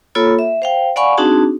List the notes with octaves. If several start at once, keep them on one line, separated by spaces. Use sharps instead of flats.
A#3 F4 A4 C#5 B5 E6
E5
C5 F5 G5
D5 F5 F#5 G#5 B5 C#6
C4 D4 D#4 F#4 G#4 A5